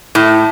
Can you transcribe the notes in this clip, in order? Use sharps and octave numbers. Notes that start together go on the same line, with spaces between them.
A2